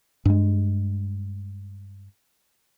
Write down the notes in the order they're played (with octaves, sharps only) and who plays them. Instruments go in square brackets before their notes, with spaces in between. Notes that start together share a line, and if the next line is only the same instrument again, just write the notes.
[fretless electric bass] G2 G#3